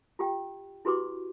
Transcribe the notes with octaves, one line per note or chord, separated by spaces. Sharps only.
F4 G4 G5
E4 F#4 G4 B4 C6 D6